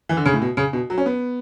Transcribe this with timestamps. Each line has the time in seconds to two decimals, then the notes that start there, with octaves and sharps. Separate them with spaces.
0.09 E3
0.17 D3
0.26 C#3
0.33 A2
0.42 B2
0.57 C#3
0.73 B2
0.90 F#3
0.98 C#4
1.06 B3